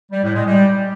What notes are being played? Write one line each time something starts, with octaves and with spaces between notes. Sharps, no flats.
G3
A2
G#3
G3